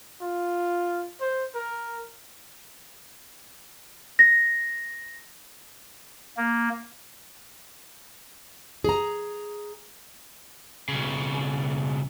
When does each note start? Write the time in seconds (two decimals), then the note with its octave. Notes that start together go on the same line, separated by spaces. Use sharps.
0.22 F4
1.21 C5
1.55 A#4
4.19 A#6
6.37 A#3
8.84 G#4 A#5
10.88 B1 C#3